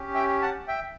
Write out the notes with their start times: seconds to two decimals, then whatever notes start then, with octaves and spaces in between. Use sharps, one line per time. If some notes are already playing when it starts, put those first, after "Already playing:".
Already playing: C#4 G4
0.15 E5 G5
0.42 F#5 A5
0.68 E5 G5